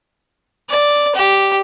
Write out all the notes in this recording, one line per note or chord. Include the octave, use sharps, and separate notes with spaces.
D5
G4